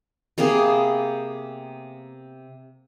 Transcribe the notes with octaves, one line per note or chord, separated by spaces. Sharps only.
C3 A#3 B3 G#4